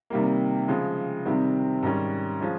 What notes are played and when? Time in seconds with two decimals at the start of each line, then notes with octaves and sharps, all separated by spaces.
0.10 C3 D#3 G3 A#3
0.68 C#3 F3 G#3
1.26 C3 D#3 G3 C4
1.83 G#2 D#3 G3 C#4
2.41 F3 G#3 C#4